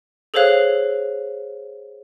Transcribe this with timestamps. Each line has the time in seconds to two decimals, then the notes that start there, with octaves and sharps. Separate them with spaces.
0.34 G#4 A4 C5 C#5 F5 F#6